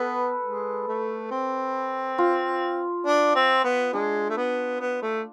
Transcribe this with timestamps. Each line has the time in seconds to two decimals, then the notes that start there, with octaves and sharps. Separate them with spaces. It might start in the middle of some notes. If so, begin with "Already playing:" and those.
Already playing: B3 A4 B4
0.43 G#3
0.88 A3
1.31 C4
2.18 F4
3.06 D4
3.35 C4
3.64 B3
3.93 G#3 D4
4.30 A3
4.37 B3
4.80 B3
5.02 A3